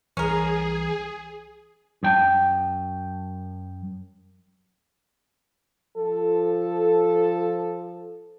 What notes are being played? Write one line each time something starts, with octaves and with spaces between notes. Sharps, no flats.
C2 E3 C#4 G#4 A#4
F#2 G5 A5
F3 A4